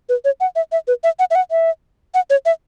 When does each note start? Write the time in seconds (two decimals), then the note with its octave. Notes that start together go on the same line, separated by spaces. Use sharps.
0.09 B4
0.25 C#5
0.40 F#5
0.56 E5
0.72 E5
0.88 B4
1.04 E5
1.19 F#5
1.31 E5
1.35 F#5
1.51 E5
2.14 F#5
2.30 C#5
2.46 E5